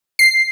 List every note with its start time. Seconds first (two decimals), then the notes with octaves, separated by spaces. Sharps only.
0.19 C7